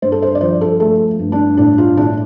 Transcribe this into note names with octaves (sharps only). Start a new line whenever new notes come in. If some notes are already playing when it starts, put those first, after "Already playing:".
G2 C5
A4
C5
D5
F3 C5
A4
A3 A4
G2
D4
A2 D4
F4
A2 D4